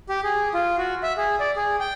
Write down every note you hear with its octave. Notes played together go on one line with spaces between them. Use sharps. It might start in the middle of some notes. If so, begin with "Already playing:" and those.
G4
G#4
F4
F#4
E5
G#4
D5
G#4
G5